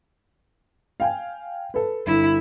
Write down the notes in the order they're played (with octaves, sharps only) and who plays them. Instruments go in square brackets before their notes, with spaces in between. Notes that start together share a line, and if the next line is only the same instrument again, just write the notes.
[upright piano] F5 G5 G#5
A4 B4
[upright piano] G1 [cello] E4